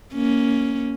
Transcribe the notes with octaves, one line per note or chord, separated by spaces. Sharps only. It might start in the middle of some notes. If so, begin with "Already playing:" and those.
A#3 C#4